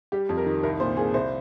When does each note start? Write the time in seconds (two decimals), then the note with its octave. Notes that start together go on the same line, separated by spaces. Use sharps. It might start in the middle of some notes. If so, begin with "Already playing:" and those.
0.12 G3 G4
0.29 F2
0.37 A#4
0.46 D#3
0.63 C2 A#4
0.80 A#2 C5
0.97 A#2 G#4
1.14 C2 C5